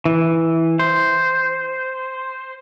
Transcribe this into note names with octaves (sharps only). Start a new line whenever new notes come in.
E3
C5